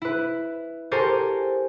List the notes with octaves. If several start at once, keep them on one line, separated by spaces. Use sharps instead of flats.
E4 B4
G4 A4 A#4 C5 G#5 C#6